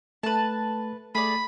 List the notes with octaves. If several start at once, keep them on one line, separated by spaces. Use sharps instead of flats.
A3 B4 A5
A3 G#4 D5 B5